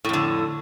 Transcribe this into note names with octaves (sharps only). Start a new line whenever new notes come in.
F2 A2 D3